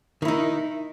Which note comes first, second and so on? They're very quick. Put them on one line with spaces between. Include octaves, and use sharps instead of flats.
D#3 E4 D#4